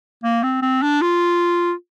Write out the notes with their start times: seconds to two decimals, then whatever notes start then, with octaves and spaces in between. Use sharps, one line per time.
0.24 A#3
0.43 C4
0.62 C4
0.82 D4
1.02 F4